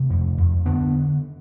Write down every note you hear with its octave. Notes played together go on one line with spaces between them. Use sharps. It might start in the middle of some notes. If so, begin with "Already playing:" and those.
Already playing: C3 A3 C4
F2
F2
D3 B3 D4